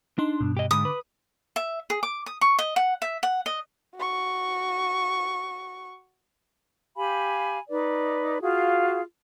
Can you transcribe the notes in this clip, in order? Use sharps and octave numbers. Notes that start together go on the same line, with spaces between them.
D4 D#4 C6
G2 B2
G4 D#5
G#2 D3 B5 D6 D#6
B4
E5
G#4
D6
D#6
C#6
D#5
F#5
E5
F#5
D#5
F#4 C#6
G4 F5 G#5 B5
D#4 B4 D5
F4 F#4 G#4 F5